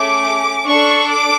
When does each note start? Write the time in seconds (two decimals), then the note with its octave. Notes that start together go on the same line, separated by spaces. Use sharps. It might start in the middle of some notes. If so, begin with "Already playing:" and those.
Already playing: A3 C#4 G#4 D6
0.67 D4 A4 C#6
1.08 D6